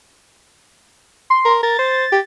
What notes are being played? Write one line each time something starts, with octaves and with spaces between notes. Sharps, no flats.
C6
A#4
A#4 A6
C5
G4